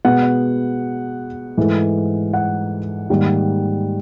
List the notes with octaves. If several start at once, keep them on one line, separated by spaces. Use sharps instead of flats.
B2 G#3 B3 F#5
G#2 E3 A3
F#5
G#2 D#3 G3 A#3